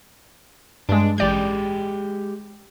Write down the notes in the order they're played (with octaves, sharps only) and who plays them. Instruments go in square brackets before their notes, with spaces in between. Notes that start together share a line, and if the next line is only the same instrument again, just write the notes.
[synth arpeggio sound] G2 G#3 [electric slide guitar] D4
[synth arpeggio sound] A1 D5 G6 [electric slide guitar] G#3 G4